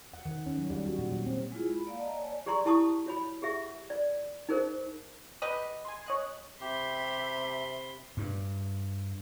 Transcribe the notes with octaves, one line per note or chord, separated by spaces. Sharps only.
F#5
D#3
C#4
F#3
G3
F#4
A#2
F#3
C4
G#3 E4 F4 G#4
B5
A#3 D5 F5 F#5
D5 D#5 A5 A#5
C#5 D5 G#5
G4 G#4 D5 A#5 C6 C#6
E4 G4 A5 C#6 D#6
F#4 C#5 B5
G4 G#4 E5 F#5
D5
D#4 G#4 A#4 C5
G4 B4 D#5
G#5 C6
C#5 D#5 F#6
C3 G4 E5 B5 C6
G2